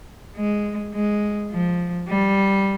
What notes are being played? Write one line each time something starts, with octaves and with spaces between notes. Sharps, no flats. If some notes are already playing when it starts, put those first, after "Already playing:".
G#3
G#3
F3
G3